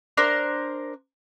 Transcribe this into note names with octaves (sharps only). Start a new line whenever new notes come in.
D4 A#4 C5